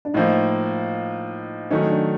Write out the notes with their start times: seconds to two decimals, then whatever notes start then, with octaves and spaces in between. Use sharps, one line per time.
0.05 D4
0.14 A2 F3 A#3 D#4
1.71 D#3 F#3 A3 C#4 D#4
1.90 D4